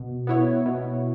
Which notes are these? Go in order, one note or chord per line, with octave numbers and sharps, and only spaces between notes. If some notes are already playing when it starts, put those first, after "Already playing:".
Already playing: B2
B3 E4 C#5
B2